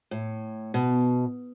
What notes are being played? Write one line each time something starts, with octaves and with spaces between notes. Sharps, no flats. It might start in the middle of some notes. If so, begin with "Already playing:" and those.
A2
B2